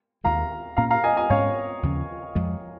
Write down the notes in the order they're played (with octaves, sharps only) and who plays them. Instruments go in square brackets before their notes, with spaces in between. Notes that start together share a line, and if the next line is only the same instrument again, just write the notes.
[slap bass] D#2 D#3 G#3 [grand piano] F5 A#5
[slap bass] A#2 A#3 C#4 [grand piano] F5 A#5
[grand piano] F5 A#5
D#5 G#5
D#5 G#5
[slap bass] G#2 G#3 C#4 [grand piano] C#5 F5
[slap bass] D#2 C#3 F3 C#4
F2 F3 G#3